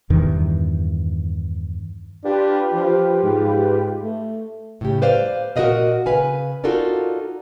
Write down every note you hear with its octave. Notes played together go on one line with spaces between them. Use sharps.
E2 G2 D#3 E3
D4 F4 G4 B4
F3
G#2
A3
A2 C#3 G4
B4 C5 D5 F5
A#2 F#4 A#4 B4 D#5 F5
C#3 B4 F5 G#5
D#4 F4 F#4 A4 A#4 D5